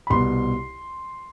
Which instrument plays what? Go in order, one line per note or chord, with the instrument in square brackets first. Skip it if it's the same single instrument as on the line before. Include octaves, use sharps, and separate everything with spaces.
[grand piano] B5
C2 B2 C6